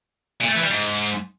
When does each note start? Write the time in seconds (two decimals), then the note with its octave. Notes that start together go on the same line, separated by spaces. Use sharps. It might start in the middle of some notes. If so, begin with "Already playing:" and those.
0.41 A#2
0.48 A3
0.56 E3
0.63 G3
0.70 G#2